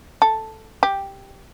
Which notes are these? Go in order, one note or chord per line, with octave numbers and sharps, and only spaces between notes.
A4
G4